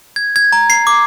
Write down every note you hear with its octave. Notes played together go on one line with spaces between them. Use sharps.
G#6
G#6
A#5
C7
D6